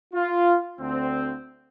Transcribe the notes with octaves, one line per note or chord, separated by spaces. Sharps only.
F4
D2 C4